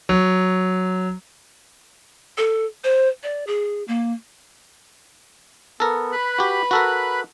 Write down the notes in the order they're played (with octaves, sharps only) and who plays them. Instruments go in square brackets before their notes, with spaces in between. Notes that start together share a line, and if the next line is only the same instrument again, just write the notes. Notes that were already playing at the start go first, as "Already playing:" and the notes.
[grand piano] F#3
[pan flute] A4
C5
D5
G#4
A#3
[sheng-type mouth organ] B3 [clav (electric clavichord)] A4 A#4
[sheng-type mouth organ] B4 B5 F#6
[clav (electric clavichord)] F#4 G4
F#4 A4 A#4